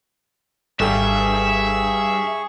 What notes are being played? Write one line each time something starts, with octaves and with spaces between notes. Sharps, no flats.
G#1 G2 G#4 A4 E5 G5 C#6